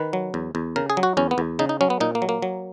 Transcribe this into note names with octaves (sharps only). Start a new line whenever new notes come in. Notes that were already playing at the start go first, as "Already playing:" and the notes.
Already playing: D#3 B4
F#3
E2
E2
C#3 A#4
G#4
F#3
F#4
E2 C#4
B3
E2
C#3 D#4
D#4
F#3 C#4
B3
A#2 D#4
A#3
F#3
A#3
F#3